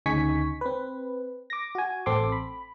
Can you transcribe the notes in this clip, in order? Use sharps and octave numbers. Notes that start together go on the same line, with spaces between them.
D2 C#3 D#4 G#5 C#6 B6
C4 B4
D6 A#6
F#4 G#5
A1 C4 A4 C6 D6
B5